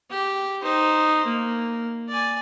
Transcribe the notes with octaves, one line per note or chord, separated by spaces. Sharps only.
G4
D#4 C5
A#3
D5 G#5